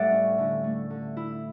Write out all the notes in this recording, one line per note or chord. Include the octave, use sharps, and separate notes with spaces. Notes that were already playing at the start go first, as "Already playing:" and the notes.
Already playing: A2 G3 E4 D5 E5 F#5
C#4
D3
A3
D3
E4